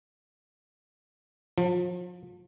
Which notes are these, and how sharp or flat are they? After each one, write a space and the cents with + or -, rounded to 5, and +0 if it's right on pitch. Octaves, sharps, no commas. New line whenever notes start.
F3 +35